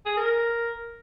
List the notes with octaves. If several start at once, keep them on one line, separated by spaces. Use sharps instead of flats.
G#4
A#4